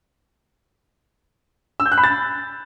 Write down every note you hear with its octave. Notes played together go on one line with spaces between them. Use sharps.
E6
G6
F#6
B5
A6